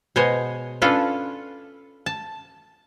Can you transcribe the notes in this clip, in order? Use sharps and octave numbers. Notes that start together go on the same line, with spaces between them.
B2 G#3 C5 C#5 D#5 G#5
C#4 D4 F4 A4 B4
A5